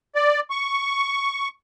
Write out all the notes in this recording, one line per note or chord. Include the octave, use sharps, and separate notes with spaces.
D5
C#6